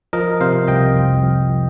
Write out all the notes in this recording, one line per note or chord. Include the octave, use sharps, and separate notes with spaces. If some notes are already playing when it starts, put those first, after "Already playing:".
F3 A#4 D#5
C3 C5 F5
C2 D#5 G5
F2
F3